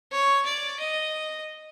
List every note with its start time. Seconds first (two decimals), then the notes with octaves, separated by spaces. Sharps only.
0.12 C#5
0.45 D5
0.80 D#5